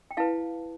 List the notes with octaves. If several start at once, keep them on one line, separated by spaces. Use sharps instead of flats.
G5
E4 B4 F5 A5